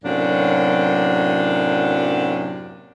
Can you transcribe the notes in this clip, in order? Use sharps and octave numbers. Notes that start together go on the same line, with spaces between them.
F#2 A2 C3 F#3 A#3 D4